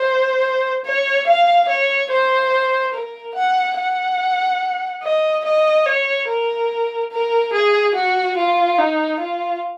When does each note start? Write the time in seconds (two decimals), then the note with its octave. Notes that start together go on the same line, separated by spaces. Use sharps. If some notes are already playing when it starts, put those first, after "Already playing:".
Already playing: C5
0.85 C#5
1.27 F5
1.69 C#5
2.11 C5
2.94 A#4
3.35 F#5
3.78 F#5
5.03 D#5
5.45 D#5
5.86 C#5
6.29 A#4
7.12 A#4
7.54 G#4
7.96 F#4
8.37 F4
8.78 D#4
9.20 F4